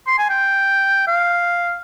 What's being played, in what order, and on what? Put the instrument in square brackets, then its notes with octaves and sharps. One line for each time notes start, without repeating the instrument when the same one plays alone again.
[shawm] C6
G#5
G5
F5